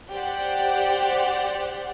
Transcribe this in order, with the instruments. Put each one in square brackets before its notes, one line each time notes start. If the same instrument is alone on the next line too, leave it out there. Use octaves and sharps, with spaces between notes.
[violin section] G4 C5 D5 F#5